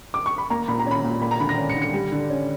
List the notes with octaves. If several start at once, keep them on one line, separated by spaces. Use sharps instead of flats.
D6
C#6
B5
A#3 A#5
A#2 B5
A#5
C#4 B5
A#2
A#3 B5
A#5
D3 B5
A#6
C#4
C#7
D3
C#7
G3
D3
C#4